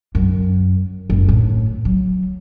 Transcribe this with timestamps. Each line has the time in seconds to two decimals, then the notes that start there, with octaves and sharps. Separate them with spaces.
0.15 F#2
1.10 F#1
1.28 A2
1.85 F#3